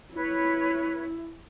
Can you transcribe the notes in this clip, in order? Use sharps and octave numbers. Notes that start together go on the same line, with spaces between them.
E4 B4 C#5